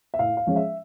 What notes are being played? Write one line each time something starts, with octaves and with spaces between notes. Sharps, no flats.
E5
A2 F5
F5
F3 G#3 C#4
E5